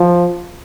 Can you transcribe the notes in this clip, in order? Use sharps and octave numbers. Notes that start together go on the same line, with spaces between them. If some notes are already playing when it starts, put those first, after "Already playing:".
Already playing: F3